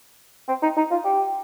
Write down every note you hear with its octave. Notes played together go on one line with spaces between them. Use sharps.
C4
D#4
D#4
F4
G4